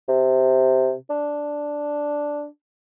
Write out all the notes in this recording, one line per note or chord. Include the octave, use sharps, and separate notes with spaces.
C3
D4